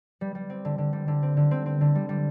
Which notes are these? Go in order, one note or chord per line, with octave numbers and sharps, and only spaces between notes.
G3
G3
C4
D3
D3
G3
D3
C4
D3
C4
C4
D3
G3
G3